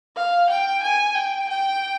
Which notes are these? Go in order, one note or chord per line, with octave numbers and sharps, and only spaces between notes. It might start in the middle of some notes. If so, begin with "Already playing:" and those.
F5
G5
G#5
G5
G5